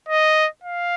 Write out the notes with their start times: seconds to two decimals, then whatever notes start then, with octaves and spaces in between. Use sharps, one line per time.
0.08 D#5
0.64 F5